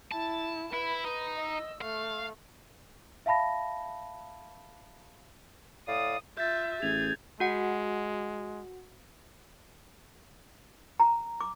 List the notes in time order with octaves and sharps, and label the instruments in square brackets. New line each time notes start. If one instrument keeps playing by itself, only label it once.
[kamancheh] E4 [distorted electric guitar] A5
[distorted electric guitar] E4 [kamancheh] B4 B5
[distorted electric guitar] D#4 [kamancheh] B4
[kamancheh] D#5 E6
[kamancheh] A3 [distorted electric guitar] F5
[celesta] E5 F5 A5 B5 A#6
[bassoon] A2 [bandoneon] D5 F5 [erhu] D#6
[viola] F4 E5 [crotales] G6 A6
[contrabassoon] A1 [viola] G#4 [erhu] G#6 [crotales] F7
[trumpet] G#3 [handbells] F#4 F#5 C#7
[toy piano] A#5
D6